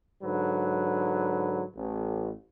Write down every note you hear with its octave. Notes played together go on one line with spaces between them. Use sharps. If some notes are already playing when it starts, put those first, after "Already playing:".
G#2 D3 F#3 B4
A1